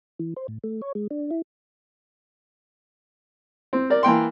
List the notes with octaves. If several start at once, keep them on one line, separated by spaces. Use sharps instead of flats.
E3
C5
A2
A3
C#5
G#3
D4
E4
C4
A#4 D5
E3 A#3 G5 C6